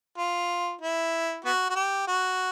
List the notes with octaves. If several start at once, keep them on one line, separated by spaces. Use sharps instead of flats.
F4
E4
B3 F#4
F#4
G4
F#4